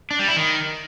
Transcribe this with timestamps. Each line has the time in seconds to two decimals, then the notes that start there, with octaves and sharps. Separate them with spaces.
0.11 D4
0.19 G3
0.28 E4
0.37 D#3